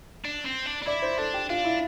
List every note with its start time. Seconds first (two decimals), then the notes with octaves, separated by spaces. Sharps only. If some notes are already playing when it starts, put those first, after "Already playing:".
0.25 D4
0.46 C4
0.66 D4
0.83 D4
0.87 E4 D5
1.02 C5
1.18 D4 A4
1.34 G4
1.49 D4 F4
1.65 E4